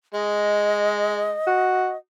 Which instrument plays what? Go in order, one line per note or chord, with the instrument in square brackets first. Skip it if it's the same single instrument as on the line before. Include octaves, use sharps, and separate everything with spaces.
[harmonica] G#3 [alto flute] D#5
[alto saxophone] F#4